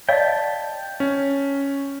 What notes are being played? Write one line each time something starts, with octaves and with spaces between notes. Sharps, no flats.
D5 D#5 F5 G5 A5
C#4